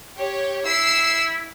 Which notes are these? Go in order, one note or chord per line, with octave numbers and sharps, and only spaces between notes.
G4 C#5
E4 E6 C7